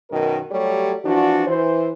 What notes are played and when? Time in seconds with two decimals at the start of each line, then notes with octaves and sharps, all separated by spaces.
0.10 F#2 B2 D#3 A#4
0.51 F#3 G3 A3 G4 C#5
1.05 E3 F3 D4 F#4
1.47 E3 C5